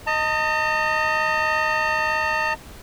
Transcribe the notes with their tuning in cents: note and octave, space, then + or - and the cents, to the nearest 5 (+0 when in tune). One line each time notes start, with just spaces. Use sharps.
D#5 +0 A5 +45